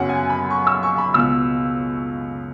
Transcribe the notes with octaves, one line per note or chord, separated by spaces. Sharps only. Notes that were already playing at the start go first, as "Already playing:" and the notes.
Already playing: F#2 C#3 F#3 B3 F#5
G#5
B5
C#6
E6
C#6
B5
C#2 B2 B3 E6